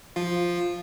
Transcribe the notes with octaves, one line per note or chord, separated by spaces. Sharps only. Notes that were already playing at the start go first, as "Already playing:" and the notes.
F3 F4